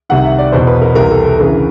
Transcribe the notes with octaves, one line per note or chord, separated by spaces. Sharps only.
C2 C3 D#3 F#5
E5
D5
E2 B2 C5
B4
A#4
C2 C3 E3 A#4
A4
A4
D2 C#3 E3 A#4